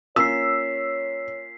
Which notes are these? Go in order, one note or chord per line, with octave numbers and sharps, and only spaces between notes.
A#3 C#4 F4 C#5 E6 B6 C7